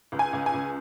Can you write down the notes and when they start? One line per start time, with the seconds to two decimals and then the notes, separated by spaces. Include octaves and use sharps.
0.12 C#2
0.19 G#5
0.33 C#2
0.46 G#5
0.54 C#2